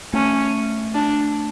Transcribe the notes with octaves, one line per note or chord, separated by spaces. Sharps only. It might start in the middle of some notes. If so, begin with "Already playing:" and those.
A3 C#4
D4